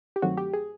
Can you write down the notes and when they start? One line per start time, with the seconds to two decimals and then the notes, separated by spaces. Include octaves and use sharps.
0.16 G4
0.22 G2 D#3 F#3 A3 C4 F#4
0.37 G4
0.54 G#4